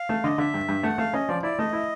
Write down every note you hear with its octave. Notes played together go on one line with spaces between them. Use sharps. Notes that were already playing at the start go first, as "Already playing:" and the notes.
Already playing: F5
A3
D3 D#5
D3 E5
G2
G2
A3 F#5
A3 F5
C#4 D#5
F3 D5
E4 D5
A3 D#5
E4